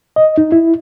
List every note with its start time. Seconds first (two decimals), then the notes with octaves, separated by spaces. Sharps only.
0.16 D#5
0.38 D#4
0.52 E4